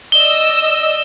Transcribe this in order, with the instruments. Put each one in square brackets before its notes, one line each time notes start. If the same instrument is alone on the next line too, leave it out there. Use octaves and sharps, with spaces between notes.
[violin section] D5 D#5 E6 [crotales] G7